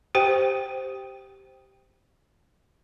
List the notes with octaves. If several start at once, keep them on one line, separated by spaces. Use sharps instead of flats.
G4 C5 G5